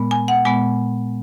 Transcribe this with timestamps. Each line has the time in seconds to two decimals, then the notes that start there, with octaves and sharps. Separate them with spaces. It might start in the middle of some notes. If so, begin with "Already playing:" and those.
Already playing: A#2 G#3 B3
0.11 G#5
0.28 F#5
0.45 A#2 G#3 B3 G#5